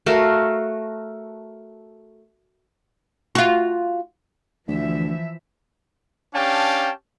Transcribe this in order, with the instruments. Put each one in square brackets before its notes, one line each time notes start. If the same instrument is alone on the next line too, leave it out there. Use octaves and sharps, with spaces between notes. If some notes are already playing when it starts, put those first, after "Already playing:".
[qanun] A3 F#4 A#4 F5
[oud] F4 F#4
[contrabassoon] D2 [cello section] E3 F3 E5
[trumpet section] C#4 D4 G4 F5 G5 A5